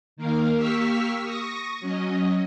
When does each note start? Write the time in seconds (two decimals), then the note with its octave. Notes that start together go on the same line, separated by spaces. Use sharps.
0.17 D#3 A#3 A#4 F5
0.57 A#3 G4 C#6 E6 F6 B6
1.21 C#6 D#6 A#6
1.80 F#3 C#4 D#5